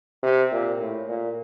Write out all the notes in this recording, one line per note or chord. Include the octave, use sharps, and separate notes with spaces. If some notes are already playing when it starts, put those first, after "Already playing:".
C3
A#2
A2
A#2